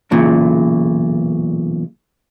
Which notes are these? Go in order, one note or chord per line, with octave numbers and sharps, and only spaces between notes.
B1 E2 A#2 C#3